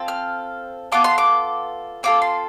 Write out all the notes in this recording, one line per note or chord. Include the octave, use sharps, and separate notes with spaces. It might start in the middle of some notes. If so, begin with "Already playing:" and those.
Already playing: C4 F4 A4
F6
B3 F4 A4 D6
C6
D6
C4 F4 A4 D6
C6